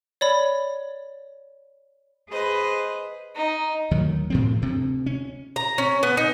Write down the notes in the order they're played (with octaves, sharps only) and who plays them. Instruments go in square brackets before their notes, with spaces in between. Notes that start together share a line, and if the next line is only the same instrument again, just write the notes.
[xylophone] C#5 D5 B5
[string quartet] G#4 B4 C5 D#5
[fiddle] D#4
[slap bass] D2 D#3 F#3
A2 F3 C4
D2 C3
C#4
[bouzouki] A#5
C#4
B3
D#4